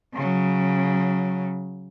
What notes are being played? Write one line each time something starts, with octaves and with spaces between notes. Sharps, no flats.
C#3 F#3